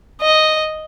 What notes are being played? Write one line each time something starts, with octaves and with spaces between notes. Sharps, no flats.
D#5